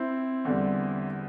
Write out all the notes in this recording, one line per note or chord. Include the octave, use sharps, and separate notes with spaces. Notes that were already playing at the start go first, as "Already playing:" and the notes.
Already playing: C4 E4
E2 D3 G3